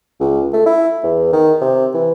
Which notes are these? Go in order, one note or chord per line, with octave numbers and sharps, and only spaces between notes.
C#2
A3
E4
E2
D#3
C3
E3